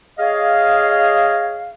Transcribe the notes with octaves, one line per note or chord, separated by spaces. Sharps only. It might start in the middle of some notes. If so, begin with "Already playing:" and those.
G#4 C#5 D#5 F5